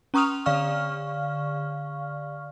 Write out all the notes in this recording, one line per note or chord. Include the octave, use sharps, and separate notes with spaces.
C#4 A#5 C#6 D#6 F6 F7
D3 D5 F5 C#6 F6